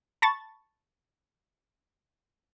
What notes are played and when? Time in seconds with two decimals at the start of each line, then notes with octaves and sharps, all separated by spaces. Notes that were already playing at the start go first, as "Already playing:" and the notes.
0.22 A5 B5 C#6 A6